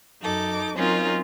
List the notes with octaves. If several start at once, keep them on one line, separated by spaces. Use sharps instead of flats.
F#2 D#4 A4 D6
F#3 C4 C#4 D#4 F4 A#4